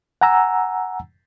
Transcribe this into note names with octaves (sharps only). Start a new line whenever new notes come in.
F#5 G#5 A#5 E6